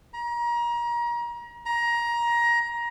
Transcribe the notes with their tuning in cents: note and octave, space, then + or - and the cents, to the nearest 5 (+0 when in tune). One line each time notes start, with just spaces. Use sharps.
A#5 +30
A#5 +20